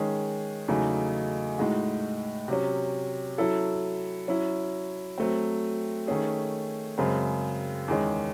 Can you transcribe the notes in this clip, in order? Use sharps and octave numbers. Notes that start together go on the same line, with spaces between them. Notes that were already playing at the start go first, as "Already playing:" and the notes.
Already playing: D#3 G#3 C#4 G#4
E2 C#3 F#3 A3 D#4
A2 G#3 D#4 F#4
C3 F#3 C#4
F#3 C#4 E4 A4
F#3 C#4 E4
F#3 A3 C4
D#3 A3 C#4 G#4
F#2 C#3 G#3 C4
E2 D#3 G#3 C#4